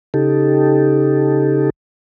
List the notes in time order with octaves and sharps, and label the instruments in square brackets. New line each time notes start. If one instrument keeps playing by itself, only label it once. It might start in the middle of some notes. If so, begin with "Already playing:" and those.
[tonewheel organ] C#3 D#4 G4 A4